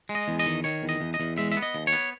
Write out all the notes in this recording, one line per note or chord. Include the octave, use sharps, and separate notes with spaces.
G#3
D#5
E2
D#5
D#3
D#3 C#5
E2
D#5
E2
D#5
E2
G#3 E5
E5
B3
D#5
D#2
C#5
B3